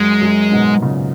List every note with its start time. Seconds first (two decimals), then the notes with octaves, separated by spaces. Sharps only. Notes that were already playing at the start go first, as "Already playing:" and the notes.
Already playing: F#2 G#3
0.22 F#2
0.51 G#2 B2
0.82 A#2 C#3